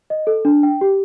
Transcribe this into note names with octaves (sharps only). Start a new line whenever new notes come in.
D#5
A4
D4
G5
G4